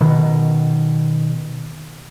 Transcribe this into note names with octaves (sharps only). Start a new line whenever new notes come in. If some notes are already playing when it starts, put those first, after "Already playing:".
B2 D#3